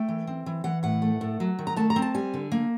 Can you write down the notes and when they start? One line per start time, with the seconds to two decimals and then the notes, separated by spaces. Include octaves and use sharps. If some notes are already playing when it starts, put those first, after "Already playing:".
Already playing: A3 G5
0.09 E3
0.27 C4
0.46 E3
0.64 E3 F#5
0.83 A2 F#5
1.02 A3
1.21 A2
1.40 F#3
1.59 D#3
1.67 A#5
1.76 A3 A5
1.90 A#5
1.96 C4
2.02 A5
2.14 G3 G#5
2.34 D3
2.52 A#3